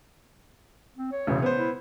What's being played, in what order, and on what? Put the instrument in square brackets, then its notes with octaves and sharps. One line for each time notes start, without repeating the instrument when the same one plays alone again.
[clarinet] C4
C#5
[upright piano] E1 A1 C#3
B3 C5
[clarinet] E4